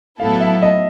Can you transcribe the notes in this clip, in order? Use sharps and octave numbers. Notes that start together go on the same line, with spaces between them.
A2 F#3 B3 E4 A4 F5
E5
D#5